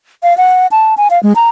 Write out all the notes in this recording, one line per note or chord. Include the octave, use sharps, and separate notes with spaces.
F5
F#5
A5
G#5
F5
G#3
A#5